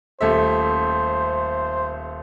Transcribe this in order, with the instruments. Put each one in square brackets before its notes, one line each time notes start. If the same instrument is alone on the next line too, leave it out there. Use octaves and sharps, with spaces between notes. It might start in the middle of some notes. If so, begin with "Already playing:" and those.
[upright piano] D#1 A3 E5 [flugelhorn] C5